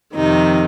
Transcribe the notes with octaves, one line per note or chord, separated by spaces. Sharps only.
F2 C3 D#3 D#4